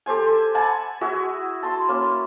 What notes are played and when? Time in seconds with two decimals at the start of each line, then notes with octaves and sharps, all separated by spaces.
0.06 G4 A4 C5 G#5
0.55 F#5 G#5 A5 B5
1.01 E4 F#4 G#4 E5
1.63 A5 C6
1.88 A#3 C#4